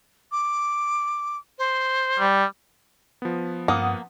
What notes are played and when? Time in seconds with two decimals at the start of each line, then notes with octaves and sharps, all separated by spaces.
0.32 D6
1.59 C5
2.19 G3
3.22 F3 B3
3.68 G2 A3 A#3 F#5 D#6